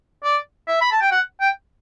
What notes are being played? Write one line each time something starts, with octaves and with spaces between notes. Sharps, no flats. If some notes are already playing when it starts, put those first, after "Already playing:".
D5
E5
B5
A5
G5
F#5
G5